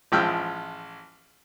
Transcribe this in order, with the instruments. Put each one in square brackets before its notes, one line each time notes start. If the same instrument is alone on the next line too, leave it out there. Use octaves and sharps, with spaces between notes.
[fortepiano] A1 F3 G#3 E5 G5 F6